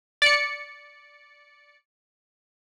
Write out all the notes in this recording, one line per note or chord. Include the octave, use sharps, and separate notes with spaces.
D5 C#7